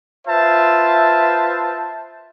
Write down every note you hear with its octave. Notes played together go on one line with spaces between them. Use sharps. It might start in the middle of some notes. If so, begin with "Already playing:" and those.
F4 B4 C5 E5 A5